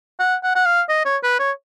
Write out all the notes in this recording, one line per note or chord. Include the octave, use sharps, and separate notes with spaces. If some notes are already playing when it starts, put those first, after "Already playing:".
F#5
F#5
F#5
F5
D#5
C#5
B4
C#5